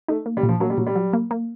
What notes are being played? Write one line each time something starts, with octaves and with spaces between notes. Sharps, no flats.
A3 D#4
A#3
G3
A#2
F3
F#3 A#3
G3
A#2 F#3
G3
F#3
A#3
A#3